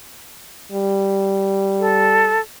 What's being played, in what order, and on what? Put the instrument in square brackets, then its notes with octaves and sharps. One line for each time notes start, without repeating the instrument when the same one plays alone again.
[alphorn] G3
[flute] A4